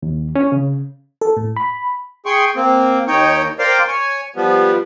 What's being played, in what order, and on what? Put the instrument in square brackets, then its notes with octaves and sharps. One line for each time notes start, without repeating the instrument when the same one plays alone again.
[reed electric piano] D#2
C#4
C#3
[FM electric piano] A4
A2
B5
[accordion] G#4 G5 C6 C#6
A#3 C4
D#2 D#4 C#5 G5
A#4 C5 D5 F5 G5 C6
C#5 G#5
F3 G3 B3